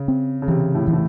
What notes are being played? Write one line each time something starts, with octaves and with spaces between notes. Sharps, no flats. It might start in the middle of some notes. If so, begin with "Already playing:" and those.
Already playing: C#3
C4
C#3
C3 E3
A2
E3
A2